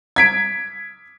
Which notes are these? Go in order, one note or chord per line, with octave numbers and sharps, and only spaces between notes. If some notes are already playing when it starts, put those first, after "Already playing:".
G#6 B6 D7